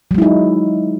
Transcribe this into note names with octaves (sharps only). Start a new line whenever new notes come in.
F#3 G#3 D#4 E4